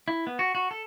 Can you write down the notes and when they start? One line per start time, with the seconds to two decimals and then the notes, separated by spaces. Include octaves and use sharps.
0.08 E4
0.27 B3
0.39 F#4
0.55 F#4
0.71 A4